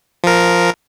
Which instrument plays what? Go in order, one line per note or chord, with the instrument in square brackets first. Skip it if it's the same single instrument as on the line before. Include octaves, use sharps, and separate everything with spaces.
[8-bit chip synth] F3 A#4